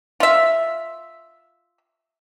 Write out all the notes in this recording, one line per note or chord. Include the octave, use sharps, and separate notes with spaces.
F4 E5